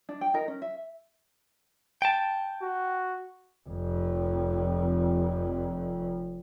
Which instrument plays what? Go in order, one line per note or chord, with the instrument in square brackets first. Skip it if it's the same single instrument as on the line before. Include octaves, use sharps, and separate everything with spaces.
[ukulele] D4
G5
D#4 A#4
C#4
E5
[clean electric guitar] G5 A5
[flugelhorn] F#4
[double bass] F1 F2